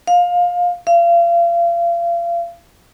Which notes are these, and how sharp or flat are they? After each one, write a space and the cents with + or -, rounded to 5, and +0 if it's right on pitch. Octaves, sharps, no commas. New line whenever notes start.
F5 +20
F5 -35